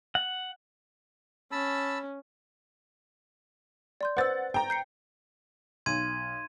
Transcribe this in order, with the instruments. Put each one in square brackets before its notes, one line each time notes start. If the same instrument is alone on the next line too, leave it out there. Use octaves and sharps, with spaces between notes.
[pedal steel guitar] F#5
[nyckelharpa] C#4 [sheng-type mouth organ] A5 B5 E6
[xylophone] D5 C6 G6
[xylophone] B4 C5 E6 [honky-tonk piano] F#5 A6
[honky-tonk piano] G5 A#5
[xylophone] G6 C7 C#7
[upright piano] B1 [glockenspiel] C6 G#6 D#7